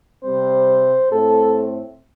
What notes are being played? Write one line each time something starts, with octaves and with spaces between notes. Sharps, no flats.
C3 G3 C4 C5
A2 A3 C4 A4